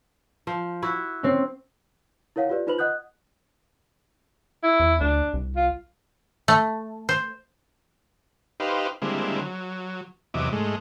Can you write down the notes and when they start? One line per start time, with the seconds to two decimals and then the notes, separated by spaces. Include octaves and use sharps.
0.47 F3
0.82 E4 F#4
1.23 C4 C#4
2.36 E4 A#4 C#5 F5 F#5
2.49 F4 G4 B4 D5
2.67 D#4 F4 B4 C5 B5 F#7
2.78 D#5 F#5 D#6 F#6 G6
4.63 E4
4.80 E2
5.01 D2 D4
5.34 C2
5.56 F4
6.48 A3
7.09 C5
8.60 D#4 G4 B4 C5 F5
9.02 D3 G3 G#3 A#3 C4 E4
9.41 F#3
10.34 E2 C3 F#3 D#5 E5 D6
10.52 G#2 G#3 A3